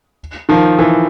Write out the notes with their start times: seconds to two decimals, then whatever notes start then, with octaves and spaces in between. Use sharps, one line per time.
0.49 D#3 F3
0.79 E3